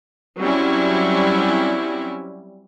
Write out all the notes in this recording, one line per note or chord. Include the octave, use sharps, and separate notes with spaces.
F#3 G3 C4 C#4 E4